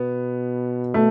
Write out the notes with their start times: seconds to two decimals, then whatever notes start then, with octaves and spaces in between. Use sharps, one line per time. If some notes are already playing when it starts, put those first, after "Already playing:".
Already playing: B2 B3
0.94 A3